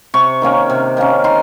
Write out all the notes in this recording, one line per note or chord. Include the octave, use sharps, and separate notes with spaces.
C3 C#6
D#3 A#3 C#4
C3
D#3 A#3 C#4
D#3 C6